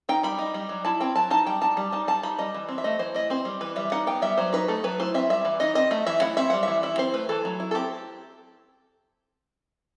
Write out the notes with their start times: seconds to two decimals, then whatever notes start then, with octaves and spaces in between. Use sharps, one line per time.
0.09 D#4 G5
0.23 G3 B5
0.39 D#4
0.54 G3
0.69 F#3
0.85 E4 A5
1.01 C4 G5
1.15 F#3 A5
1.30 D#4 A5
1.46 G3 G5
1.61 D#4 A5
1.77 G3
1.92 D#4 A5
2.07 G3 A5
2.23 D#4 B5
2.38 G3 D#5
2.54 E3
2.69 C4
2.78 E5
2.84 A3 D#5
2.99 E3 C5
3.15 E4 D#5
3.30 C4 C5
3.45 G3
3.61 E3 B4
3.76 G3 E5
3.92 D#4 F#5
4.07 B3 G5
4.22 G3 E5
4.38 F#3 C5
4.53 D#4 B4
4.68 A3 A4
4.84 F#3 B4
5.00 E4 C5
5.14 C4 E5
5.30 G3 E5
5.45 E3
5.60 D#4 D#5
5.75 C4 D#5
5.91 A3 E5
6.06 E3 E5
6.21 E4 F#5
6.37 C4 E5
6.50 G3 F#5
6.63 E3 E5
6.83 E4 E5
6.98 C4 C5
7.14 A3 B4
7.29 E3 A4
7.45 F#3
7.60 E4
7.71 A4
7.75 C4 G4